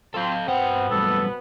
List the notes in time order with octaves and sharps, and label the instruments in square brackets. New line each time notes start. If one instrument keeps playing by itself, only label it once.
[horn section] C4 F4 [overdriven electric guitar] A4 F5
[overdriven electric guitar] G2 F#5 [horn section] B2 B3 [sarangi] C4
[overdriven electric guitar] B1 G2 [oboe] A4 [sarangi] B4